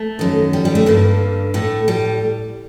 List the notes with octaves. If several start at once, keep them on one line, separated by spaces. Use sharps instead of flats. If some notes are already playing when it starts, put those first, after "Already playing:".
Already playing: A3
F#2 D#3
G3
G3
A3
G2 D3 A#3
A2 A3
G3